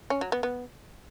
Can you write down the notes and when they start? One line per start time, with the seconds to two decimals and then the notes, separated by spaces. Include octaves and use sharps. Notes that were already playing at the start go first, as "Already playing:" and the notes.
0.10 C#4
0.21 F#3
0.32 B3
0.43 B3